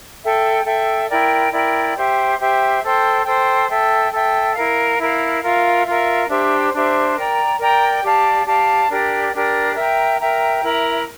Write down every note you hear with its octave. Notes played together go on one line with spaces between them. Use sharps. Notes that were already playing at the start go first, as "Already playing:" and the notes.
A4 E5 G5
A4 E5 G5
E4 A#4 D5 G5
E4 A#4 D5 G5
G4 C5 E5
G4 C5 E5
A4 C5 G5
A4 C5 G5
A4 E5 G5
A4 E5 G5
E4 A#4 F5
E4 A#4 F5
F4 A#4 E5
F4 A#4 E5
D4 G4 C5 E5
D4 G4 C5 E5
A#4 D5 G5 A#5
A#4 D5 G5 A#5
G4 D5 F5 A5
G4 D5 F5 A5
D4 G4 A#4 D5
D4 G4 A#4 D5
A#4 E5 G5 A#5
A#4 E5 G5 A#5
E4 A#4 E5